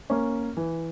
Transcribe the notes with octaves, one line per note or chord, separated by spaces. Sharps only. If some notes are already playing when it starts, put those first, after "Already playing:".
A#3 C#4
E3